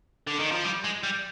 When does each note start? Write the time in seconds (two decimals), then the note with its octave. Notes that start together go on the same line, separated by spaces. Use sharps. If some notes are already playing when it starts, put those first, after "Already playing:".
0.27 D3
0.39 D#3
0.52 F3
0.64 G3
0.84 G#3
1.03 G3